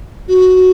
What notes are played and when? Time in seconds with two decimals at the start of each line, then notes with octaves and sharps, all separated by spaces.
0.28 F#4